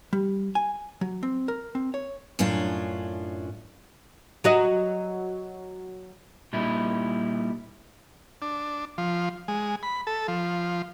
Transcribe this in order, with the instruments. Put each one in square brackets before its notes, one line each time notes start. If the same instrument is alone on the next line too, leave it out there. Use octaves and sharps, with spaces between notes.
[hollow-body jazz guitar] G3
G#5
F#3
C4
A#4
C4
C#5
[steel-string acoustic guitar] F#2 A2 C#4 D4 F4
[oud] F#3 F#4 D#5
[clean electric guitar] A#2 G3 D#4 E4
[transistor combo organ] D4
F3
G#3
B5
A4
F3